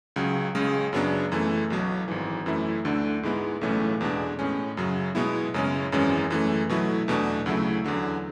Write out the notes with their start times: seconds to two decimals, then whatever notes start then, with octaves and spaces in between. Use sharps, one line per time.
0.16 C#2 C#3 F#3
0.55 C#2 C#3 G#3
0.93 F#2 C#3 F#3 B3 D4
1.32 F#2 E3 A3
1.70 B1 B2 F#3
2.08 G#1 G#2 E3
2.46 F#2 E3 A3 E4
2.85 D2 D3 A3 D4
3.23 G#2 G#3 B3 E4
3.61 B1 A2 E3 A3 C#4
4.01 E2 B2 G#3 D4
4.39 A2 G#3 C#4
4.77 F#2 C#3 F#3
5.15 B2 G#3 B3 E4
5.54 F#2 C#3 G#3 C#4
5.92 G#1 F#2 E3 G#3 C#4
6.30 F#2 E3 A3
6.69 B2 F#3 A3 E4
7.08 E2 B2 A3 D4
7.46 D2 C#3 F#3 A3 E4
7.84 E2 D3 F#3